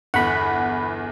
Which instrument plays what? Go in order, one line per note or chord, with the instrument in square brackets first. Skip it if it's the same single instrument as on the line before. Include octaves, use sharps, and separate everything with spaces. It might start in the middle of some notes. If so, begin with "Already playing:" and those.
[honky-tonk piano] G1 E2 [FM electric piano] F#5 B5